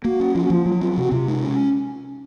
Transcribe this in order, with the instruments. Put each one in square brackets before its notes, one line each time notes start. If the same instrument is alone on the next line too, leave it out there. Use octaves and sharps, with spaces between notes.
[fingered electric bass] A#3 [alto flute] F#4
[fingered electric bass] C#4
[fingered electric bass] F3 [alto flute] F4
[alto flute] F#4
[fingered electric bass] F3 [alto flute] F4
[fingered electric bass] F#3 [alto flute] F4
[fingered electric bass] C4 [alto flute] F4
[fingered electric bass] C3 [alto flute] F#4
[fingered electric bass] C3 [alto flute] F4
[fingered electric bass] G#3 [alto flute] D#4
[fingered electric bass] C#4